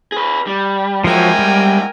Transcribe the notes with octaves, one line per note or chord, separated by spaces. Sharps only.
G#4 B4
G3
F3 F#3 G#3 E4 A#4 G5 G#5
G3